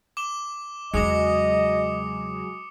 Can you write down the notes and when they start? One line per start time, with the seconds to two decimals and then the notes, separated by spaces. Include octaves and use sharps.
0.17 D6 E7 G7
0.94 E2 C#3 F#3 G#3 D#5 D6 D#6 C#7